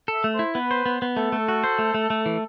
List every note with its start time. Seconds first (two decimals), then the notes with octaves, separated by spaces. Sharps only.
0.08 A4
0.13 E5
0.24 A3
0.34 C5
0.39 E4
0.55 B3 B4
0.71 C5
0.86 B3
1.02 B3
1.17 A3 A4
1.32 A3
1.48 F#4
1.64 C5
1.79 A3
1.94 A3
2.10 A3
2.26 E3